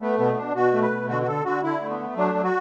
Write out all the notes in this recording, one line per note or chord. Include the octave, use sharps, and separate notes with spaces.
A3 B3
B2 B3
B3
B2 D4
B2 F#4
A3
B4
B2
D3 F#4
F#4
D3 A4
D3 F#4
D3 E4
A3
B3
A3
F#3 D4
F#3
F#4